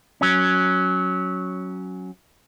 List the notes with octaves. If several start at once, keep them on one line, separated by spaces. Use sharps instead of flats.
F#3 C#4